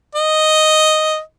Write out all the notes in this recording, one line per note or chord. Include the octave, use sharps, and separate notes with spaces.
D#5